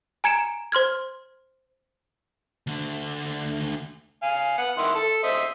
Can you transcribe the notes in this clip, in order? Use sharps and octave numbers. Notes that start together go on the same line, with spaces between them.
G#5 A#5 G#6 C#7 D7 E7
C5 C6 F6 G#6
D2 D3
F5 G#5
B3 F#5
D#3 E4 C6
A4
C5 D#5 E5